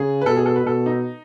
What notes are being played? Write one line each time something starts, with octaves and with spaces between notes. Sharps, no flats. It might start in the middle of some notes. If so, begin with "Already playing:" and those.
Already playing: C#3 G#4
B4
B2 A4
G#4
A4
B4
B2 A4
D#4